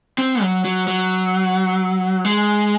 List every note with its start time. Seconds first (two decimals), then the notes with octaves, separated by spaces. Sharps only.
0.18 C4
0.42 F#3
0.65 F#3
0.88 F#3
2.25 G#3